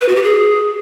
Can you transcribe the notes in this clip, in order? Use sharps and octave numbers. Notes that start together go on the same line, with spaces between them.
B4
F#4
G4
G#4